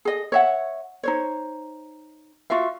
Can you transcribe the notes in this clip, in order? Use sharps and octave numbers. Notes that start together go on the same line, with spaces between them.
G#4 D#5
C#5 E5 F#5
D#4 C5 C#5
F4 F#4 E5 F5